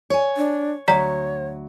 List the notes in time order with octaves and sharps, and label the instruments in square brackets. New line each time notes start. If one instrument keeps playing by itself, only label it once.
[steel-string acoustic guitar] C#5 G#5
[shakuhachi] D4
[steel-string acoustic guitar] D2 F#3 [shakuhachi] C#5 [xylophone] D5 A#5 B6